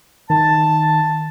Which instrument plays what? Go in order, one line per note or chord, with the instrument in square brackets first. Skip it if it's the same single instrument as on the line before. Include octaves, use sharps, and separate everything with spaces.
[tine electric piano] D#3 [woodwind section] A5